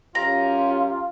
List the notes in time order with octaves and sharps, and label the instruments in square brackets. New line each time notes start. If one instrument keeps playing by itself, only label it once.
[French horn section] F#2 C#4 G4 [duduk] F4 [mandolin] A#5